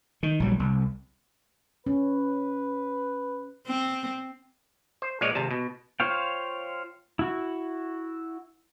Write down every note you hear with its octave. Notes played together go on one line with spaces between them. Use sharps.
D#3
A#1 F#3 G3
C2
C#4 B4
C4
C5
A#1 F3 G#3 C#5 D5
G#1 C3 A5
B2
F4 C5 C#5 F5 G5
E4 F#4